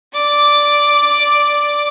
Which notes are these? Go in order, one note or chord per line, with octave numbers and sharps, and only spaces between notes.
D5 D6